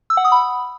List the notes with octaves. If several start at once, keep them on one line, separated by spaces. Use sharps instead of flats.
E6
F#5
D#6
B5